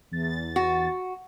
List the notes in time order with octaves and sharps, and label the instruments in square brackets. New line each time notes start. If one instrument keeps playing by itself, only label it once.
[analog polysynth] E2 A6
[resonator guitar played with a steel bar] F#4